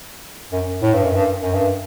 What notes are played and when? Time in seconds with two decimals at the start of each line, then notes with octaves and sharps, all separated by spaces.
0.52 F#2
0.82 A2
0.94 G2
1.04 F#2
1.15 G2
1.42 F#2
1.54 G2